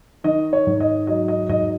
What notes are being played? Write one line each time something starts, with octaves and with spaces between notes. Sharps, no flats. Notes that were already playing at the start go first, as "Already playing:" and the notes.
D#3 D#5
C#5
G#2
D#5
F#3 D#5
D#5
G#2 D#5